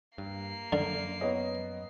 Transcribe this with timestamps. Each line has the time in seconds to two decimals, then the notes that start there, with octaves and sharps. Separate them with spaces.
0.18 G2 A#3 C7
0.72 F#2 D3
1.21 B3 C#5 D#5